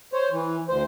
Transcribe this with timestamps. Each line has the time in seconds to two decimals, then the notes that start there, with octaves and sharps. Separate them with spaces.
0.13 C5 C#5
0.31 E3
0.69 D2 C5